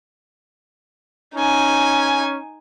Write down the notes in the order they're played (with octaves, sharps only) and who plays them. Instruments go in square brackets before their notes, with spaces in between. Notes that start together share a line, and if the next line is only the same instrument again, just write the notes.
[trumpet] C#4 [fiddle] D#4 G#5